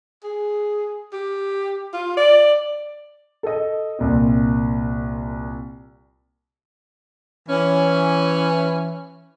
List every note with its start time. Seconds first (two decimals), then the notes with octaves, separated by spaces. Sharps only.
0.24 G#4
1.13 G4
1.93 F4
2.17 D5
3.43 A4 D#5
3.99 C2 A#2
7.49 E3 C#4